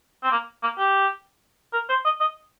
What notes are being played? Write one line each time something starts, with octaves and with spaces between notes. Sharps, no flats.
C4
A#3
A#3
G4
A#4
C5
D#5
D#5